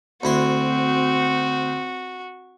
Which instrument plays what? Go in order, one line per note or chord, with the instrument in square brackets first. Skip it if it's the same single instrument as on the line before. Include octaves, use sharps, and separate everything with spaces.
[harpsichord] D2 E4 C6 [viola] C4 [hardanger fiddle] F#4